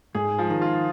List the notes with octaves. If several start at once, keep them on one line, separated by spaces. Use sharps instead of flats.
G#2 G#4
F3
D#3
F4